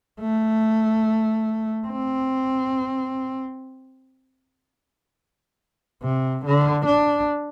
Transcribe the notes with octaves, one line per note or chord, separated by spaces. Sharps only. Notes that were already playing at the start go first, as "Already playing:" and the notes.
A3
C4
C3
D3
D4